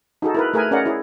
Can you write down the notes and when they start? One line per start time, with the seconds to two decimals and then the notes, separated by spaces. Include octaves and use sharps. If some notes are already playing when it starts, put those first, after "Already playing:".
0.22 D#4 F#4 G#4 A4
0.34 E4 A#4 B4
0.53 A3 G#4 A#4 B4 G#5
0.71 C#4 G#4 A#4 D5 D#5 F#5
0.86 E4 G#4